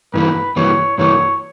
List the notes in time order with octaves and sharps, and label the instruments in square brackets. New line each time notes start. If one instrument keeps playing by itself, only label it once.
[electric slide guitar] G2 E3 A#3 [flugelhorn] B4
[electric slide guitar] G2 E3 A#3 [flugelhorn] C#5
[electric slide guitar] G2 E3 A#3 [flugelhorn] C#5